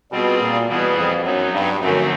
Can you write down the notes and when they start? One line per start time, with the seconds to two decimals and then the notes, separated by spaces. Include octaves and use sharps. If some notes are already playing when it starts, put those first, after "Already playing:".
0.11 B2 G3 C4 F4 G#4
0.40 A#2
0.68 B2 E3 G3 B3 E4 G#4
0.96 F2
1.24 F#2 F#3 B3 D#4
1.53 G2
1.80 F#2 D3 F3 A3 C4 D#4